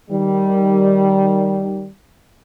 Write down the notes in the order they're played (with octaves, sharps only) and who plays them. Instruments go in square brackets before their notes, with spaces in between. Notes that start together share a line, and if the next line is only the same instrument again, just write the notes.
[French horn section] D#3 G3